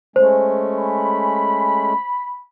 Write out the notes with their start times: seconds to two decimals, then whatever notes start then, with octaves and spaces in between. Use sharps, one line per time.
0.16 G#3 A3 C#4 C5
0.78 B5